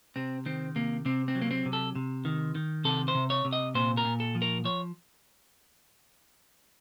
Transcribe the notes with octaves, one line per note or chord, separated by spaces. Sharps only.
C3 C4
D#3 C4
C3 A#3
C3 C4
C4
F#3
A#3
C4
C3
A4
C3
D#3
D#3
C3 A4
C5
C3
C#5
C3
D#5
A#2 C5
A#4
A#2
A4
F3
A#4
F3 C#5